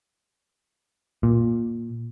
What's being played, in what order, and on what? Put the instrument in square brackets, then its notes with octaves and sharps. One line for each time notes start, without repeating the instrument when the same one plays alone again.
[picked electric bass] A#2